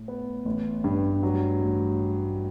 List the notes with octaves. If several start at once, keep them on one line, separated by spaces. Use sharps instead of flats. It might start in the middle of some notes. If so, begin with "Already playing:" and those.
Already playing: A2
B3
A1
G2
F#3
A1